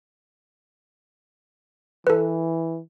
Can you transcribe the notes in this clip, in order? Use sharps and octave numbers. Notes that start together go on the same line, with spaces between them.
E3 A4 B4